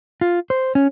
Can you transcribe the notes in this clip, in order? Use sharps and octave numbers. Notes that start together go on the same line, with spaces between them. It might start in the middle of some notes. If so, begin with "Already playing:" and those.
F4
C5
C#4